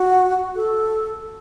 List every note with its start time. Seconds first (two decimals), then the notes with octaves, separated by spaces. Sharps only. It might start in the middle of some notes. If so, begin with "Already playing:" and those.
Already playing: F#4
0.55 A4